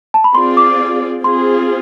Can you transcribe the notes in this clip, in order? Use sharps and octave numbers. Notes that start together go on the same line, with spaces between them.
A5
B5
C4 F4 G#4 D5 C6
D6
C4 F4 G#4 C6